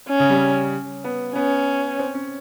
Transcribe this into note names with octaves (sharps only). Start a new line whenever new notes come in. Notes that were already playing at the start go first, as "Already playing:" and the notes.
C#4
C#3
G3
B3
B3 C#4
C4
C#4